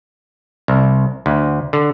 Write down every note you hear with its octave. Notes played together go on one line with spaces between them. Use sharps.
C2
D2
D3